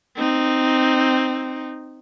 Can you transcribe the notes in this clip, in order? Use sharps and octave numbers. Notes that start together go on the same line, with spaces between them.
C4 D#4